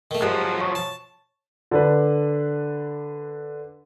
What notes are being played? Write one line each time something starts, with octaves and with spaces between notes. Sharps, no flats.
D#3 A3
G#2 F3 F#3 G4 F#6
C#5 C#6
A5
D3 D4 B4